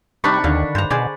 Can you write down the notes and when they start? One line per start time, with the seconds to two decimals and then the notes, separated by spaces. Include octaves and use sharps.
0.24 C3 G3 D4 D#4 A5 B5 C#6
0.44 D#2 D3 D#3 F5
0.75 G2 C5 A#5
0.90 B2 G#4 C5 D5